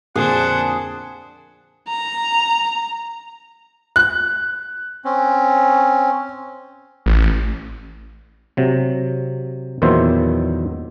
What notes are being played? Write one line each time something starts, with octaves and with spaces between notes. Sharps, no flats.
F2 A#2 D3 D4 G#4 C5 F#5
A#5
F#6
C4 C#4
A1
C3 F#3
E2 A#2 D#3 F#3 C5 E5